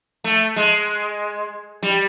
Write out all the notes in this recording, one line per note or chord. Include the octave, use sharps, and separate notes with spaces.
A3
G#3
G3